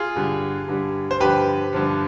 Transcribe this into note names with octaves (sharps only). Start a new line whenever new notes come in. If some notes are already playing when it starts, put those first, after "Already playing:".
Already playing: F4 G#4
G2 D3 G3
G2 D3 G3
C5
G2 D3 F3 G4 B4
G2 D3 F3